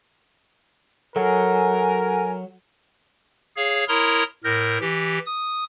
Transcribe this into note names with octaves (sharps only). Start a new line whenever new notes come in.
F#3 A4 A#4 F#5 G#5
G#4 C#5 F5
E4 A#4 C#5 A#5 C6 D#6
A2 A#4 G6 A#6
E3 G4
D#6